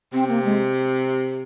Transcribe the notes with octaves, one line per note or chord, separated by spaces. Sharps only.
C3 C4
A#3
G#3